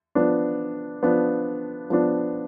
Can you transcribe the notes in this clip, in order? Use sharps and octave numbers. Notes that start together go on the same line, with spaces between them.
F3 B3 D4
F3 B3 D4
F3 B3 D4